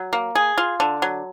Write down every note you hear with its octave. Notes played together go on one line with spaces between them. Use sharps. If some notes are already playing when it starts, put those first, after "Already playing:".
Already playing: F#3
A#3
G#4
F4
D3
F#3